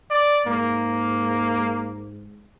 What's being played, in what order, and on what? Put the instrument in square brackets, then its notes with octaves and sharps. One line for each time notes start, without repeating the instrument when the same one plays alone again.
[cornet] D5
[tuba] G#2 [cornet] A#3